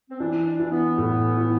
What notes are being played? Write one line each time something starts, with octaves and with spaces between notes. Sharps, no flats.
C4
E3 D4
D4
E3
B3
A2
E3